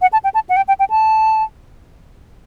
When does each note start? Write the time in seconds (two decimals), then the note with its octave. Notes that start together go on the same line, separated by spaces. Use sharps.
0.02 F#5
0.13 A5
0.24 G5
0.34 A5
0.49 F#5
0.56 G5
0.68 G5
0.80 G5
0.90 A5